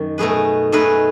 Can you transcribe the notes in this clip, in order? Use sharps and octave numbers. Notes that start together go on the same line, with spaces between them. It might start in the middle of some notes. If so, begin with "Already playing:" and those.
Already playing: F#2 D#3
B2 A3 D#4 G#4 B4
B2 A3 D#4 G#4 B4